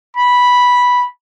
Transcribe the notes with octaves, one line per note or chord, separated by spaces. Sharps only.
B5